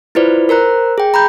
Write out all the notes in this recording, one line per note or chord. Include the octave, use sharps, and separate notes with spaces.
E4 F4 B4 C5 D5
A#4 C5 A#5 F#6
G#4 G5
A#5 B5 G6